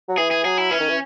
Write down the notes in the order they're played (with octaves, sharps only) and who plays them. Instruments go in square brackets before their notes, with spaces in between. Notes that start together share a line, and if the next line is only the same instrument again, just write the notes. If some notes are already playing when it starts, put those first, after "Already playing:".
[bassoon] F#3
[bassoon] E3 [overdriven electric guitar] G#4
[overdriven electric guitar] G#4
[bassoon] F#3 [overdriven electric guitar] G#4
[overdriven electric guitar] E4
[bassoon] E3 [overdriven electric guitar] C#4
[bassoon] D#3
E3